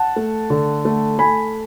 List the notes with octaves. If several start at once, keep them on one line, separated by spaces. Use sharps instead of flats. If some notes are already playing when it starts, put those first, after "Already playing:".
Already playing: F#5 A5
A3
D3
A3
A3 G#5 B5